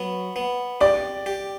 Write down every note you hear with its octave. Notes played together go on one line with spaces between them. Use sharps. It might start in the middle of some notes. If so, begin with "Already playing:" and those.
Already playing: F#3 B3
B3
G4 D5
G4